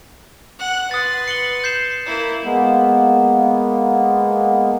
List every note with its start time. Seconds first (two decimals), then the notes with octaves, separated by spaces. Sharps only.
0.59 F#5 F#6
0.91 B4 C6 D#6 A6
1.28 C#7 F#7 G7
1.64 G6 C7 E7
2.06 A#3 E4
2.43 G#3 A#3 B3